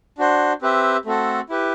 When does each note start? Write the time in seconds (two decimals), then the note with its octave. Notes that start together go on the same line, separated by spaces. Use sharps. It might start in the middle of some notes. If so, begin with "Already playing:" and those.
0.18 D4 F#4 C5
0.62 C4 G4 B4 E5
1.05 A3 C4 F#4 A4
1.50 E4 G4 B4